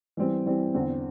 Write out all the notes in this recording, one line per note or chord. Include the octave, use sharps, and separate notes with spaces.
E3 G3 C4
E3 G3 C4
E2 D3 C4